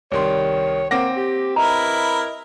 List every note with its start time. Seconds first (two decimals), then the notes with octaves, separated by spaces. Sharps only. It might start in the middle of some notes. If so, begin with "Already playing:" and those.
0.12 C2 D#3 C#5 C6
0.91 A#3 C4 F#5 D6 A#6
1.17 G4
1.56 E4 A#4 B4 D#5 A#5